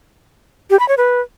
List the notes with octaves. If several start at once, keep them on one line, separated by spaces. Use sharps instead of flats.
G4
B5
C#5
B4